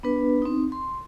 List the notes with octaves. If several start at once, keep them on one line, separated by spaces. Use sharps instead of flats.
B3 D4 B4
C4 D#4
C6